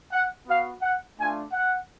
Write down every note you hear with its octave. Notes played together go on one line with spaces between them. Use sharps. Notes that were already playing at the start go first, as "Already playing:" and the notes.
F#5
B3 F#4 F5
F#5
A3 D4 F4 G#5
F#5